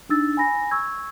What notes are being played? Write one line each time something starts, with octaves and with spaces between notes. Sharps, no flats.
D4 D#4 E6 A6
G#5 B5 A#6
C#6 E6 G#6